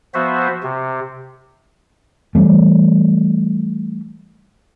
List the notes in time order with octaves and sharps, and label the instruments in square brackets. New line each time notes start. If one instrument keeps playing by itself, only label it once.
[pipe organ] F3 B3 F#4 C5 E5
C3
[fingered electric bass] E3 F3 G3 A3